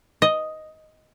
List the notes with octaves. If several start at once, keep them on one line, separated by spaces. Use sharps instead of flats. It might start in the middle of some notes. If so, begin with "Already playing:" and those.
D#5